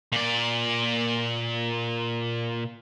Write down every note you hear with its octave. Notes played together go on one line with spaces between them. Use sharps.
A#2 D5